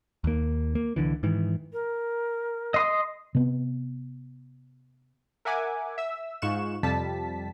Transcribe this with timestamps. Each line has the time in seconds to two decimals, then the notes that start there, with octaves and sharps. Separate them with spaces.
0.24 D#2 A#3
0.75 A#3
0.96 C2 D3 E3
1.23 G#2 D#3 E3
1.73 A#4
2.74 D#5 C6 D#6
3.35 C3 B3
5.45 A#4 E5 F#5 G#5 D6
5.98 E5 E6
6.42 G#2 F4 C#6 F#6 E7
6.83 F2 C3 G3 A5 B6